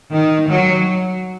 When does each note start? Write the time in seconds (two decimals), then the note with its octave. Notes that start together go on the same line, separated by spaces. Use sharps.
0.12 D#3
0.48 F#3